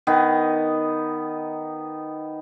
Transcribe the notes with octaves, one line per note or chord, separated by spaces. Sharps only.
D#3 B3